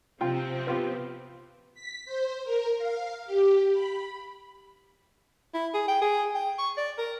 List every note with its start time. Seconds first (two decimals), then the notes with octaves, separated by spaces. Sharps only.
0.21 C3 F3 C4 F4 G5
0.67 B3 F4 G4
1.74 B6
2.05 C5
2.44 A#4
2.78 F5
3.25 G4
3.72 B5
5.54 E4
5.74 G#4
5.88 G5
6.02 G#4
6.35 G5
6.58 C#6
6.77 D5
6.98 A#4